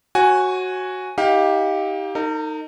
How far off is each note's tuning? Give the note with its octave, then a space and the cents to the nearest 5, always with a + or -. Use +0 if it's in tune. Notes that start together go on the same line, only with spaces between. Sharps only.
F#4 +0 C#5 -35 G#5 +0
D#4 +40 G4 +0 F5 +25
D#4 +0 A#4 -45